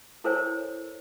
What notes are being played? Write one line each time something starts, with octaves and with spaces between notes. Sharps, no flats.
E4 A4 A#4 C5 C#5 G#5